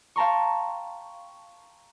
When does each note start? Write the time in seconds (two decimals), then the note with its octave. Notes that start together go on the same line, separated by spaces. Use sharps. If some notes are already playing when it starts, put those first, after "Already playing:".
0.16 F5 G5 A5 A#5 C6 C#6